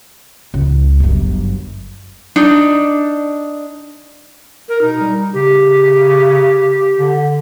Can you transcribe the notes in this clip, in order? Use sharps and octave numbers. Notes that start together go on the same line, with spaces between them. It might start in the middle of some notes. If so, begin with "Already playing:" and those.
C#2
G1 F#2
D4 D#4
A#4
B2 D#4
G3
C#3 G4
D3